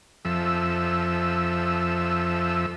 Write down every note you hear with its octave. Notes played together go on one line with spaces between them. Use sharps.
F2 F3 A4 E5 E6